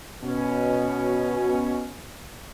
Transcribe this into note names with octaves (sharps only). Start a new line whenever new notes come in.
B2 C#4